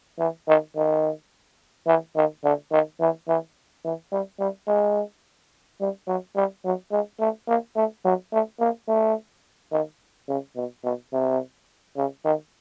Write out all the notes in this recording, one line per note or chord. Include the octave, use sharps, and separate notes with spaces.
E3
D#3
D#3
E3
D#3
D3
D#3
E3
E3
E3
G3
G3
G#3
G3
F#3
G3
F#3
G#3
A3
A#3
A3
F#3
A3
A#3
A3
D#3
C#3
B2
B2
C3
C#3
D#3